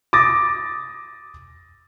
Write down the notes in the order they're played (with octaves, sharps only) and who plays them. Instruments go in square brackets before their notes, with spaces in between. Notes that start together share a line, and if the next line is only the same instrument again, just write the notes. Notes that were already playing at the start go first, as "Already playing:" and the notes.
[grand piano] D6 D#6 A6 A#6